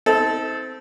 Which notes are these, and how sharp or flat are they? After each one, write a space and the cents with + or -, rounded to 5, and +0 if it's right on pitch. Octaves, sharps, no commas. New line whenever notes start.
C4 -15 D#4 +40 A4 -10